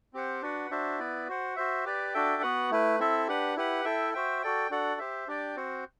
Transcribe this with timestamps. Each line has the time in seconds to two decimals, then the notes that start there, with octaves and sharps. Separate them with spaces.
0.13 C4 G4 C5 F#5
0.42 D4 F#4 B4 F#5
0.70 D4 F#4 C5 E5
0.99 B3 E4 B4 D5
1.28 F#4 C5 F#5
1.56 F#4 C5 E5
1.85 G4 B4 D5
2.14 D4 F#4 A4 E5 G5
2.42 B3 F#4 B4 F#5
2.71 A3 E4 B4
2.99 C4 E4 A4 E5
3.28 D4 G4 B4 F#5
3.56 E4 G4 B4 F#5
3.85 E4 A4 E5 G5
4.14 F#4 C5 E5 G5
4.42 F#4 A4 D5 G5
4.70 D4 F#4 A4 D5 F#5
4.99 G4 C5 E5
5.27 D4 G4 D5 G5
5.56 C4 F#4 C5 F#5